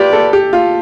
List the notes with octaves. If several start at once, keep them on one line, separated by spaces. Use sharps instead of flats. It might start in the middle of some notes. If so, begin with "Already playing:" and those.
Already playing: F4 G4 B4 D5
A4
G4
F4